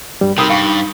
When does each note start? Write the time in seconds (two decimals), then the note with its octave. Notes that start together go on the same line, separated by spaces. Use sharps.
0.21 G2 G3
0.38 C3 D#4 A#4 G5 B5 D#6 E6
0.50 G2 D#4 F5 C#6